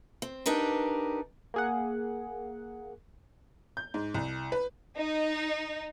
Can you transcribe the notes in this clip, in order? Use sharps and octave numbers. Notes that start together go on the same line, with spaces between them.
C4
D4 D#4 G4 A#4 B4
A#3 G#4 F#5
G6
G#2
C2
B4
D#4